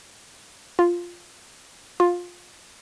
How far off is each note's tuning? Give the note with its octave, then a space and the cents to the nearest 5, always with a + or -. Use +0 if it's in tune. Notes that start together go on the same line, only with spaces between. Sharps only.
F4 +0
F4 +15